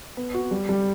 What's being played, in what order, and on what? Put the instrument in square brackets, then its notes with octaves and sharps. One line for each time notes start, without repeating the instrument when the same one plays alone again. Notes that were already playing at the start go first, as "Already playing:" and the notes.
[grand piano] B3
F#4
G3
G3